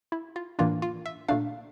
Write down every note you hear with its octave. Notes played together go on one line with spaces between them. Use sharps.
E4
F4
A2 E3 A#3 D4 F4
F4
E5
A#2 A3 D4 F5